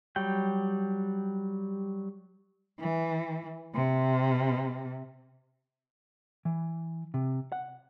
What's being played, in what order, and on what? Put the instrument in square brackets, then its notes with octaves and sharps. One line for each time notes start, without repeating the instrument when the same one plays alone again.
[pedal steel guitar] F#3 G3 G5
[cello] E3
C3
[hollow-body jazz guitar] E3
C3
F#5